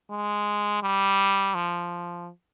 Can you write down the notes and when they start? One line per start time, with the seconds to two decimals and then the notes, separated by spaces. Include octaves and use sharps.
0.11 G#3
0.83 G3
1.55 F3